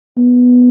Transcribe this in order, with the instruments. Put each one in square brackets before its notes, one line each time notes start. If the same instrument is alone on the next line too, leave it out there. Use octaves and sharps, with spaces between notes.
[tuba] B3